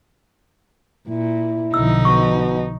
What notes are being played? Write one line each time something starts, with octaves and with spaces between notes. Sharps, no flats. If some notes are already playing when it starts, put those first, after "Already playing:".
A#2 E4
B1 D3 F3 D#4 E6
B2 C#6